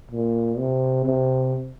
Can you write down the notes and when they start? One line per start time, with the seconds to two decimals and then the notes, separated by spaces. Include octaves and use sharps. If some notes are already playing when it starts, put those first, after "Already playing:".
0.11 A#2
0.58 C3
1.06 C3